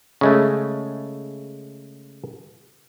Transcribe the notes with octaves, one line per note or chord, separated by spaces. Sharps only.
C#3 G#3 A3